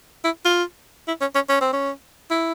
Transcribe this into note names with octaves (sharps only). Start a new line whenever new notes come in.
E4
F4
E4
C#4
C#4
C#4
C4
C#4
E4